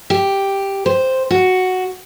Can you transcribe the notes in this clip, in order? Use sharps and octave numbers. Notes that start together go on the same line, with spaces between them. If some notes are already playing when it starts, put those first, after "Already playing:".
G4
C5
F#4